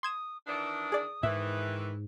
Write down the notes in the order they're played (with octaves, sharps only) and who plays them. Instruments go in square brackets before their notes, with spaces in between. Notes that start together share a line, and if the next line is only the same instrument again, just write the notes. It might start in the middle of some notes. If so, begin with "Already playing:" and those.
[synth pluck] C6 G#6 E7 [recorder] D#6
[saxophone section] D#3 E3 D4 [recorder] D#6
[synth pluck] G#4 D5
[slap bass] G#2 [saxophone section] D#3 E3 [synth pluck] E5